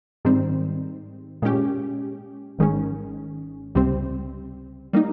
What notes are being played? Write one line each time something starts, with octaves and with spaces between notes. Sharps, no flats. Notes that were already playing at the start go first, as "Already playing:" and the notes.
G#2 D#3 G3 C4
A#2 G#3 C#4 G4
G#1 G#2 D#3 G#3 C#4
C#2 C3 G3 C4
G3 A#3 D#4